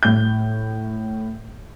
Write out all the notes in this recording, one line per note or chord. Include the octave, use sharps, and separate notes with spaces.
A2 G6